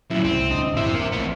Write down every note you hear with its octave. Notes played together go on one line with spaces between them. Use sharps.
F#2 A#2 E4
C2 G#3 C4
D1 D4 D#5
G#1 F2 A#2 E4 C5 E5
A#3 C4
A1 F3 B3